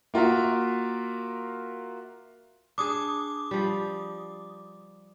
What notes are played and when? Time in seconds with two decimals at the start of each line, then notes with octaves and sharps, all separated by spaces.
0.14 A#3 F4 F#4 A#4 E5
2.78 D4 G#4 D6 D#6
3.51 F3 G3